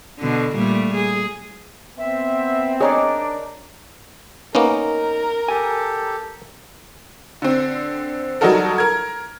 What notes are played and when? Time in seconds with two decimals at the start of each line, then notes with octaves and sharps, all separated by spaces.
0.19 B2 D3
0.55 A#2 G3 A3
0.95 G#4
1.98 B3 C4 E5
2.81 D4 D#4 G#4 A#4 C#5 D5
4.55 A#3 B3 C#4 D#4 A#4
5.48 G4 A4 G#5
7.42 D3 C4
8.41 F#3 G3 D#4 F#4 A4 A#4
8.78 A#4 G#6